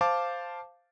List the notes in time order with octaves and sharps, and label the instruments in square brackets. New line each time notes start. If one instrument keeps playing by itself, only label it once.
[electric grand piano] C5 F5 A5 D6